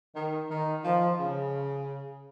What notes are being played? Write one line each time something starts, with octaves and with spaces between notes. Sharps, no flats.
D#3
D#3
F3
C#3